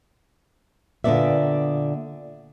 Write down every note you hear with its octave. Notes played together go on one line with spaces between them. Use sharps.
A#2 D3 A3 B3 D5 E5